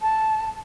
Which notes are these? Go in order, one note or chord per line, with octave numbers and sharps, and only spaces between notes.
A5